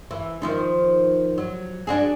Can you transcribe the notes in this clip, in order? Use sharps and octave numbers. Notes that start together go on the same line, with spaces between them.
E3
D#3 F3 D#4
F#3
D4 F#4 G#4